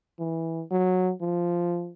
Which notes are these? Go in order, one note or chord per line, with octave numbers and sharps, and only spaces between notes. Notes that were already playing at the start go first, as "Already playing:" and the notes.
E3
F#3
F3